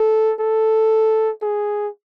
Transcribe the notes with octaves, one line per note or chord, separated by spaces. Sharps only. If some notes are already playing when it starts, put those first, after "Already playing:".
Already playing: A4
A4
G#4